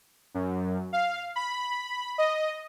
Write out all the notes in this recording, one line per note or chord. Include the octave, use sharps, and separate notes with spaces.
F#2
F5
B5
D#5